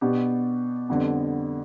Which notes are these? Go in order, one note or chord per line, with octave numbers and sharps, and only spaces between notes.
B2 B3 D4 G4
F2 D3 G3 B3 D4